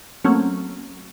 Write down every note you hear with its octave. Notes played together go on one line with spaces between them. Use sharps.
F#3 A3 A#3 C4 C#4